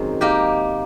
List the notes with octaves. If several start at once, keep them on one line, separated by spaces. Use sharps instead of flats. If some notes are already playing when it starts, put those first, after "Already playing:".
Already playing: F#2 D#3 G#3 C4
A#3 D#4 G4 A#4